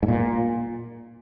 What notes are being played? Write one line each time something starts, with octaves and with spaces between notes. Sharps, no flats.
G#2
A#2